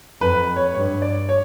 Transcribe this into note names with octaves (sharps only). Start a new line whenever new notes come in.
F2 B4
C#5
G2 C#5
D5
C#5